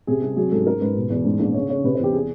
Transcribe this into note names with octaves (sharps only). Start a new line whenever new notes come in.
C3 G#4
C2
F#3 G#4
G#2 A4
G#2 A#4
G#2 B4
B2
E2
G#2
A#1
C#3 C#5
C#3 C#5
C3 B4
C5
E2 G4
G#4